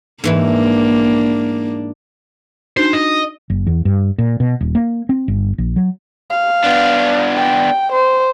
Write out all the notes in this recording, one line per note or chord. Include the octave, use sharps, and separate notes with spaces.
G#2 E3 A#3 D4 E4
D4 D#4 F#4 C5
D#5
F#1
E2
G2
A#2
B2
D#1
A#3
C4
G1
A#1
F#3
F5
B3 D4
G5
C5